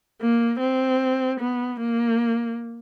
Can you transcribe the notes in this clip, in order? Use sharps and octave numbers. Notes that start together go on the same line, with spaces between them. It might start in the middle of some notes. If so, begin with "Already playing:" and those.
A#3
C4
B3
A#3